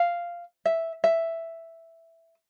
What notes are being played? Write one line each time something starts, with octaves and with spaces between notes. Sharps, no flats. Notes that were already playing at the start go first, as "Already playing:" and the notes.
Already playing: F5
E5
E5